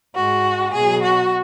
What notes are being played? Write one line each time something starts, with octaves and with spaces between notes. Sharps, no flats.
G#2 G#3 F#4
B2 F#3 G#4
F#4